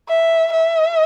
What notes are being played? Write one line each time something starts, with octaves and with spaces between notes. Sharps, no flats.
E5
E5